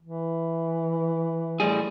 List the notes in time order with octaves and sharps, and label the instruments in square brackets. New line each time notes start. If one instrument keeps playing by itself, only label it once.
[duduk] E3
[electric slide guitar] A2 G3 G#4